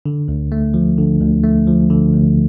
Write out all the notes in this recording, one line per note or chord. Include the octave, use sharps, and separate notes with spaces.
D3
D2
A3
F3
D3
D2
A3
F3
D3
D2